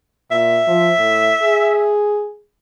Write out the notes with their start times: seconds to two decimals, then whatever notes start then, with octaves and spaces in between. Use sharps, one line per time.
0.31 A#2 E5
0.67 F3
0.98 A2
1.42 G#4